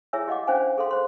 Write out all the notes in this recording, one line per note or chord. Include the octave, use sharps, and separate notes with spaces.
E4 G#4 C#5 E5 G#5 E6
G4 D#5 F5 F#5 D6
C#4 D4 C5 F5 F#5 G#5
G#4 A4 F5 C6
G#4 C5 C6